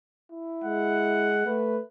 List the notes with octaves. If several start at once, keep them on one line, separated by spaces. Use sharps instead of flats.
E4
G#3 F#5
A3 B4